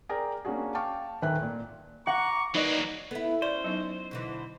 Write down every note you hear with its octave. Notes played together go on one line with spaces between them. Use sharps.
G#4 A#4 D5 G5 A#5
A#3 C#4 D4 F#4 G#4
F5 G5 A5 C#6 D6 F6
D#1 D#3 B4 E5 G5 F#6
A#2
F#5 A#5 C#6 D6
F#3 A#3 D#4 B4 D5 D#5
B3 E4 A4 B4
C#4 C5 D5
F#3 B3 D#4 D#5
B2 D3 E3